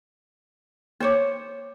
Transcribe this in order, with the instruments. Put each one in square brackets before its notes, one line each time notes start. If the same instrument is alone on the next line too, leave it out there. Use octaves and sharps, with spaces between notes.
[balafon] A#3 D6 [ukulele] C5 C#5